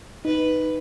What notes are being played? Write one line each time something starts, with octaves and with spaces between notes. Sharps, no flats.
D#4 B4